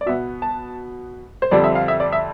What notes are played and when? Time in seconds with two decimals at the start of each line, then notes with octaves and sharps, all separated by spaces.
0.01 D5
0.06 B2 B3 E5
0.42 A5
1.42 C5
1.51 F2 D3 G3 C4 D5
1.64 E5
1.75 F5
1.88 E5
2.00 D5
2.13 E5